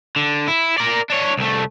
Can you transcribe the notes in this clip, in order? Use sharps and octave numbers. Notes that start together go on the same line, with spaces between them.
D3
E4
A#4 D5
D4 C#5
C2 A3